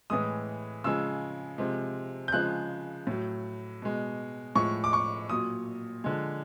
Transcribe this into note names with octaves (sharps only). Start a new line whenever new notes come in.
A2 E3 G#3 D#6
C#3 F3 G#3 E6
C3 F3 G#3
G6
C#3 F3 G#3 F#6
A2 F#3
B2 G#3
A2 F3 G#3 C#6
D6
C#6
A#2 F#3 D#6
D3 F3 G#3